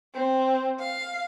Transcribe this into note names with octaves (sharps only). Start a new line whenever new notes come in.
C4
F5